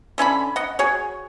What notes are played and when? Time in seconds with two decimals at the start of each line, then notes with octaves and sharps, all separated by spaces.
0.18 D3 C#4 E5 B5
0.56 D#5 F#5
0.79 F#4 G#4 C#5